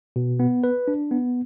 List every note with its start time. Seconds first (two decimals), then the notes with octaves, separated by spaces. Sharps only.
0.16 B2
0.40 B3
0.64 B4
0.88 D4
1.11 B3